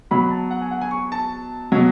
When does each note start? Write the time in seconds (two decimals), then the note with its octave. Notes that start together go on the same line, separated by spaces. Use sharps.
0.11 B2 F#3 B5
0.31 A5
0.51 F#5
0.61 G#5
0.71 F#5
0.81 G#5
0.91 C#6
1.12 A5
1.72 B2 F#3